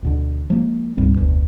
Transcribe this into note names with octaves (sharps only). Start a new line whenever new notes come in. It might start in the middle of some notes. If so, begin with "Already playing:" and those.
D2 B2 D3
F3 G#3 A#3
C#2 G#2 G3 C4
F1 D2 B2